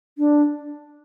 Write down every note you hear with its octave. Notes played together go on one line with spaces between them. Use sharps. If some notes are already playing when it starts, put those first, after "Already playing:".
D4